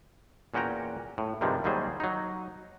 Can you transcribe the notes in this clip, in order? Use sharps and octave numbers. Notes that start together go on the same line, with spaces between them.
E2 A#2 C#4 F#4 G5 A#5
A2
G2 C3 D#3 F3 G3 G#3
D#2 F#3 G3 G#4 C5
F#3 D#4